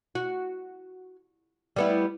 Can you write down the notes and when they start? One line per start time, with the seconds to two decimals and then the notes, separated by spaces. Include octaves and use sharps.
0.15 F#4
1.76 G3 B3 E4